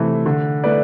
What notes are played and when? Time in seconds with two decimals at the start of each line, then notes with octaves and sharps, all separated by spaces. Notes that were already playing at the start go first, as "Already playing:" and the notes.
Already playing: C3 E3 A3
0.26 D3
0.64 A3 E4 B4 D5